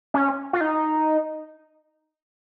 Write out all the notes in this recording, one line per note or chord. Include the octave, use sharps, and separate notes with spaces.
C#4
F4
D#4